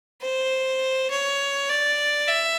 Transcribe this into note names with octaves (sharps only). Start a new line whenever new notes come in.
C5
C#5
D5
E5